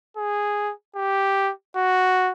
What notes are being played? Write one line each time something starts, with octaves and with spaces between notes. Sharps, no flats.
G#4
G4
F#4